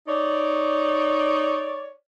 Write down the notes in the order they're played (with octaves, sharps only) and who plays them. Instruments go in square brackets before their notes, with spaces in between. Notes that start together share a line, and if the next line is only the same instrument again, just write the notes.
[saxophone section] D#4 C#5 D5